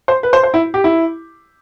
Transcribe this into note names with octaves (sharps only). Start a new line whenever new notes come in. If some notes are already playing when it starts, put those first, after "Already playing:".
C5
B4
C5
C5
E4
G4
E4